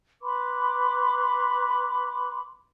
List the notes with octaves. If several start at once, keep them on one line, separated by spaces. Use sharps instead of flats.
B4 B5 C6 D6